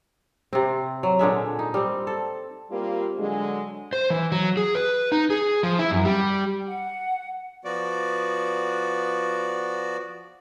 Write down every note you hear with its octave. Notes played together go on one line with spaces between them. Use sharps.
C3 C4
F#3
A#2 D3 G#3 E5
D#4
G3 C4
A4
G3 A#3 C4 F4 G4
D3 F#3 G#3
C5
E3
F#3
G#4
B4
D#4
G#4
F3
E4
F#2
G3
F#5
F3 B3 F#4 D5